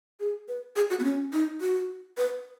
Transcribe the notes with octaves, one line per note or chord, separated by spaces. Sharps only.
G#4
B4
G#4
F#4
B3
C#4
D#4
F#4
B4